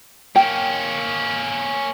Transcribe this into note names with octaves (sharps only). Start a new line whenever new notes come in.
A#3 C#4 G5